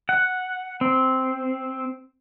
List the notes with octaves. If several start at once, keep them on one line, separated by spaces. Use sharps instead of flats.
F#5
C4